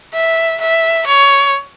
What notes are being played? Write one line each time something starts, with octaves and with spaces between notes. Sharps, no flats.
E5
E5
C#5